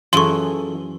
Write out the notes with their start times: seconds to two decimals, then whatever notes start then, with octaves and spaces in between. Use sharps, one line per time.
0.13 F#2 E3 F4 G#4 A4 C6 C#6